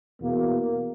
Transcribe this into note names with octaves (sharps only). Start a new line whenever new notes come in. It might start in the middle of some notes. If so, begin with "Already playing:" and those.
E2 B2 A#3